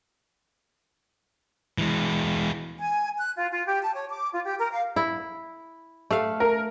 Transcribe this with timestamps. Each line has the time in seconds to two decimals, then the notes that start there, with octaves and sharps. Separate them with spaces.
1.78 E3 G#3
2.79 G#5
3.17 F#6
3.35 F4
3.51 F4
3.66 G4
3.81 A5
3.95 C#5
4.09 D6
4.32 F4
4.43 G4
4.58 A#4
4.71 F5
4.96 E4
6.11 A3 F5
6.40 A#4